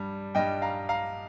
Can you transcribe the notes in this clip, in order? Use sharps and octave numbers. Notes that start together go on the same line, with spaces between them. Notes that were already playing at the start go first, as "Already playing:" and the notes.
Already playing: G2 G3
G2 G3 D#5 G5
F5 A#5
F5 A#5